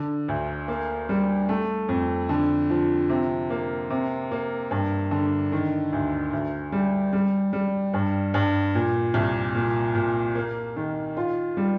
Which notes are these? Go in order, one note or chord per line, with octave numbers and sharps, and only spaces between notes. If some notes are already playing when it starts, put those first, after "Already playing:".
Already playing: D3
D2
A#3
G3
A3
F2
D3
F3
C3
A#3
C3
A#3
G2
D3
D#3
D2
D2
G3
G3
G3
G2
G2
A#2
C2
A#2
A#2
A#3
D#3
F4
G3